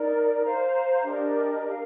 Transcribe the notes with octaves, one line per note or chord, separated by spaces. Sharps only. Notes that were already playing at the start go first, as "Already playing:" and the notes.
Already playing: D#4 A#4 D5
C5 F5 A#5
D4 G4 A#4 D#5
A#4 F5